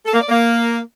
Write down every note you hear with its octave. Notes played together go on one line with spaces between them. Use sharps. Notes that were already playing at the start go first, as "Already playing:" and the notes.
A4
A#3
D5
A#3